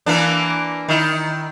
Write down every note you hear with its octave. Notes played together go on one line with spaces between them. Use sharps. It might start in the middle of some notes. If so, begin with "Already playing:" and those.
E3 A#3 D4
D#3 E4